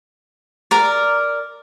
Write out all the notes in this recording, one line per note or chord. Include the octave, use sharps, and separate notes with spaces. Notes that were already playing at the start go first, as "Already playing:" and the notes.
A#4 D5